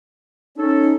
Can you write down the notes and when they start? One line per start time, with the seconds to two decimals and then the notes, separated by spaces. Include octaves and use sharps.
0.56 C#4 D#4 A4